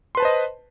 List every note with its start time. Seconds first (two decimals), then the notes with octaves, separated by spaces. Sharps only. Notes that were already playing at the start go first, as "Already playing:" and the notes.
0.15 C6
0.17 B4
0.20 A5
0.22 C5
0.25 D#5